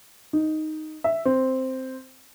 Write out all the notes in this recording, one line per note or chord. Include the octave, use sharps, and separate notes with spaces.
D#4
E5
C4